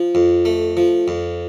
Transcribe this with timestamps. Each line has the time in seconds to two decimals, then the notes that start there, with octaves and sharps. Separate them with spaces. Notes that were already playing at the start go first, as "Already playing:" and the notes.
Already playing: F3
0.15 F2
0.45 A3
0.77 F3
1.08 F2